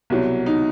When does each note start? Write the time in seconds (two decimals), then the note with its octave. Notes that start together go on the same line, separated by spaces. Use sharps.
0.10 C2 B2 F#3
0.46 D#4